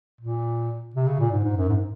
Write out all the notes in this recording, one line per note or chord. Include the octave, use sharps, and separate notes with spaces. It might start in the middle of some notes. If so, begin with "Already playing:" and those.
A#2
C3
C#3
A#2
G#2
G#2
F#2
G#2